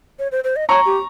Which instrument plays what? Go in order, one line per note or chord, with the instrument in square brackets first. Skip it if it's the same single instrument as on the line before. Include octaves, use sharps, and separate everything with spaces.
[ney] C#5
C5
C5
D#5
[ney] C#5 [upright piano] A#5 C#6
[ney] G4